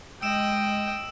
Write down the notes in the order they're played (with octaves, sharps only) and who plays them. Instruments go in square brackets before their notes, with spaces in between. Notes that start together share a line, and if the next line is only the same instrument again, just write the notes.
[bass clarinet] G#3 [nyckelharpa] D#5 G5 [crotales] E6 D7 E7